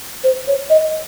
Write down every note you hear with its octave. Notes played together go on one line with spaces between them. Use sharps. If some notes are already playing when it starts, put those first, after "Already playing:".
C5
C#5
D#5